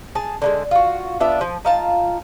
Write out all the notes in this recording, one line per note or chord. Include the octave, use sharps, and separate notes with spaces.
G#4 A5
D3 G3 G#3
F4 F#4
B3 D4 F4 E5
F3
D#4 F4 A5